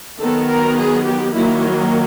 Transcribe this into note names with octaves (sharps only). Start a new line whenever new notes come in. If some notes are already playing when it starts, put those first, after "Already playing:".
D#3 F#3 B3 A4
A#4
G#4
G4
D#3 F#3 A#3 E4